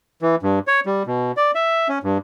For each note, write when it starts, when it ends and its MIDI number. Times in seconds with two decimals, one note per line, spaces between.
0.22 0.36 52
0.43 0.59 43
0.67 0.80 73
0.86 1.03 55
1.07 1.32 47
1.37 1.51 74
1.55 1.88 76
1.88 1.99 61
2.03 2.18 43